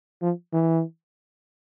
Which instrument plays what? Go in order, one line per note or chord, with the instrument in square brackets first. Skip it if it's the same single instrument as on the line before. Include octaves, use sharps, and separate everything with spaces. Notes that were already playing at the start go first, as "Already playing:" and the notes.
[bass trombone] F3
E3